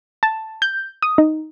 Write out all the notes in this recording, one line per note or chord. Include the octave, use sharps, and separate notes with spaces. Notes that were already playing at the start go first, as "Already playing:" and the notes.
A5
G6
D#6
D#4